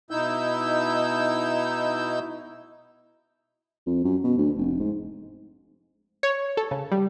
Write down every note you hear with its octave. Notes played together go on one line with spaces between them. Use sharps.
B2 D#4 E4 E6 G6
F2
F#2
B2
D2
F1
G#2
C#5
A4
C#3
G3